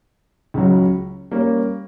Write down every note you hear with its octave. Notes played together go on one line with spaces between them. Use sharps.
C#2 C#3 F#3
G3 A#3 C#4